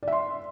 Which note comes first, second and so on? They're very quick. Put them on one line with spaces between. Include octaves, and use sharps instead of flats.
D5 E5 C6